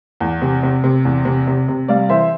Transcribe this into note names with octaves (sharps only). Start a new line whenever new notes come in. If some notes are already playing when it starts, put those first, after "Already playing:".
E2
C3
C3
C3
E2
C3
C3
C3
G3 D5 F5
E3 C5 E5